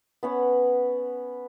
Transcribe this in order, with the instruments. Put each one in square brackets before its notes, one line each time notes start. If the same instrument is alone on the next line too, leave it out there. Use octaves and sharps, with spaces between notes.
[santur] B3 C#4 F#5